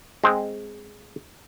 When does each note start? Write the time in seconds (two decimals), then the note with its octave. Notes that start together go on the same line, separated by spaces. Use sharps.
0.24 G#3 C4